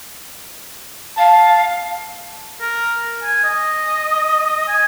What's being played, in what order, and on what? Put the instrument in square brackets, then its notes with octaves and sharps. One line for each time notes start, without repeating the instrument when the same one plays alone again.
[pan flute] F5 [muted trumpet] A5
[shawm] A#4
G#5
D#5
G#5